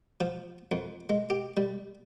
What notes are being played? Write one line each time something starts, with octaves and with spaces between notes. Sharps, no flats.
F3
F2
G#3
G4
G3